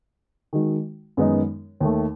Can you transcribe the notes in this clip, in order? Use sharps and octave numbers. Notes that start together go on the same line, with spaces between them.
D#3 G#3 D#4 F#4
F#2 D#3 G#3 B3 D#4
D#2 D#3 A3